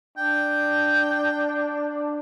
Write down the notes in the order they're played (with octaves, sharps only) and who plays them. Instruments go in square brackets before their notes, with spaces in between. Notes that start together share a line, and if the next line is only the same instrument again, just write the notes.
[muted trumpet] D4 [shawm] G5